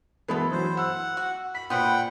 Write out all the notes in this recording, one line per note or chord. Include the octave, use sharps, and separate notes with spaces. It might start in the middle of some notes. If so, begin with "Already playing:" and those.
B2 E3 G#3 B3 E4 A4
E3 F#3 C5
F#5 E6
F#4
B5 B6
A#2 B3 C4 F#5 G5